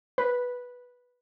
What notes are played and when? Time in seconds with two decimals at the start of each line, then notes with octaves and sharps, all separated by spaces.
0.18 B4